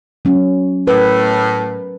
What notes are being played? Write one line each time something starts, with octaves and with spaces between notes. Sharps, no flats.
F#3 C#4
A2 A#4 B4